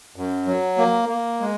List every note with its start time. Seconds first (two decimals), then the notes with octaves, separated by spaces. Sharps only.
0.16 F#2
0.47 F#3
0.78 A#3
1.09 A#3
1.41 G#3